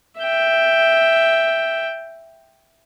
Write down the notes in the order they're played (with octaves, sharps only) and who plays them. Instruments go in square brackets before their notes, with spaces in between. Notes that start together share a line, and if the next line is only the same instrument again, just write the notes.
[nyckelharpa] E5 G5